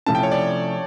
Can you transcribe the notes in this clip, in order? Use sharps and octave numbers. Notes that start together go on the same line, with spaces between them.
C3 F3 A3 C#4 E4 A5
G5
C#5
D5